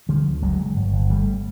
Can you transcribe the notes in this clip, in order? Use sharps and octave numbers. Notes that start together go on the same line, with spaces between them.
D3 F3 G3
D2
F#1 F#3 G#3
F#1
G1
G1
G1 G3 A3